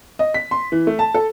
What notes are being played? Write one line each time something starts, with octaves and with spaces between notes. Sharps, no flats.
D#5
B6
C6
E3
A3
A5
A4